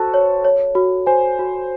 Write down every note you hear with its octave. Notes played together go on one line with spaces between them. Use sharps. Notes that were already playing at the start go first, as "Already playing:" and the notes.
Already playing: F#4 A4 C5 A5
C#5
C#5
F#4
C5 G#5
F#4